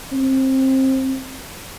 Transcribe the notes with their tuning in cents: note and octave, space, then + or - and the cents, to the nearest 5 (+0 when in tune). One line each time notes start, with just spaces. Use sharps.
C4 +20